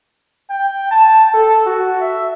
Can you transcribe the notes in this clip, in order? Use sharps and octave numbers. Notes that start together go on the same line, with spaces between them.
G5
A5
A4
F#4
E5